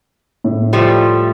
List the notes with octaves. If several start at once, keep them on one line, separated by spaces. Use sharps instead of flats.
A2
F3 G3 A3